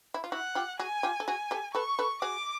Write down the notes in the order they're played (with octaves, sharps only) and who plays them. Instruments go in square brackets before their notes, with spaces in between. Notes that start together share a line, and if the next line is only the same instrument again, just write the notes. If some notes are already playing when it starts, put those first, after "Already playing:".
[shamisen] E4
F4
[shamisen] E4 F#4 [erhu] F#5
[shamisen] F4 G4
[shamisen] F#4 G#4 [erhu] G#5
[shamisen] F4 G4
A4
[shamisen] F#4 G#4 [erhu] G#5
[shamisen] G4 A4
[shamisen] A4 B4 [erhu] C#6
[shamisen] A4 B4
[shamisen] F#4 G#4 [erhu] D6